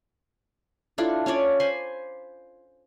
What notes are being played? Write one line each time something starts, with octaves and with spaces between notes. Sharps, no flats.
D4 E4 F4 A4
C#4 F4 C#5 D5
C5 G#5 B5 C6